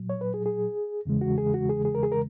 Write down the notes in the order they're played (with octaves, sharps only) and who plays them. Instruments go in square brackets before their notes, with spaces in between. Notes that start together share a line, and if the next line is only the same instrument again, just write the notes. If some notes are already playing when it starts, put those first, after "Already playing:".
Already playing: [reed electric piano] A#2 F#3
C#5
B4
G#4
G#4
E2 C#3 E3 G#3
F#4
G#4
F#4
G#4
G#4
A#4
G#4
A#4